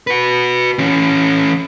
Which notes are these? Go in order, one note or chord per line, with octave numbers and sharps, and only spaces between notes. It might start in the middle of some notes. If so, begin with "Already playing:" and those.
F#4 B4
E3 C#4